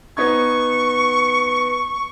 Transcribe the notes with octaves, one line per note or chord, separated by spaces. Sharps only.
B3 D#4 C#6 G#6